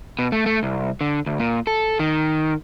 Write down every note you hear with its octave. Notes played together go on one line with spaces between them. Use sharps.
B2
A3
A3
C2
D3
D2
A#2
A4
D#3